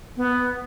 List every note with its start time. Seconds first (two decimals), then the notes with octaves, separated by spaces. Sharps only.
0.17 B3